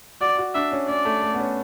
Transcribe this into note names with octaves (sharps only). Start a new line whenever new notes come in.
F#4 D5
F#4
D4 E5
C#4
C#4 D5
A3
A3
B3
C#4